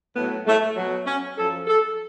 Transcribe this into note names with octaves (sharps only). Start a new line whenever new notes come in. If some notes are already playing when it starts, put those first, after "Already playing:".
A2 F#3 B3
A3
B2 F#3
C#4
F#2 F3 A4
A4